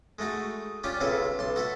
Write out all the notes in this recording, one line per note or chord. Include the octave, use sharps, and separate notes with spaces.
G#3 A3 D#4 F#4
C#4 D4 F4 G4
B1 C#3 F#3 C4 A4 E5
B1 A5 C6
F#4 A4 E5